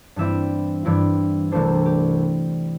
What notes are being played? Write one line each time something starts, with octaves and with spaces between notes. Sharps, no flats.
G2 E3 G3 C4 E4 E5
G2 E3 G3 C4 E4
C2 C3 E3 A3 D4 C5
G4